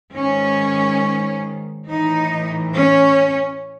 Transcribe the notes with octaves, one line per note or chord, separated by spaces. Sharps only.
G#2 D#3 C#4
A2 E3 D#4
C#4